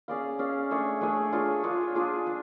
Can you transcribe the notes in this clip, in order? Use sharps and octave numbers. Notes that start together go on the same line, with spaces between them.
C#4 G#4 D5 F5
C#4 G#4 D5 F5
A3 D4 G#4 C#5
A3 D4 G#4 C#5
D4 F4 G#4 C#5
D4 F4 G#4 C#5
D4 F4 G#4
D4